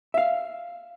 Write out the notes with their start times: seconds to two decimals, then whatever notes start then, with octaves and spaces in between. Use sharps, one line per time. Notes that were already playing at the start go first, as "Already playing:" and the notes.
0.14 E5 F5